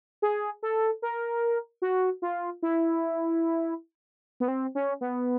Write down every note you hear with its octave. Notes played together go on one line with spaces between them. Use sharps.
G#4
A4
A#4
F#4
F4
E4
B3
C4
C#4
B3